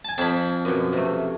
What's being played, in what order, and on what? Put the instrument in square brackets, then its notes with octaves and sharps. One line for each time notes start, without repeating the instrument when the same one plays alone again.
[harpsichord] G#5 A5
[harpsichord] F2 [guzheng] A5 B5
[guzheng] F#2 B2
C3 A3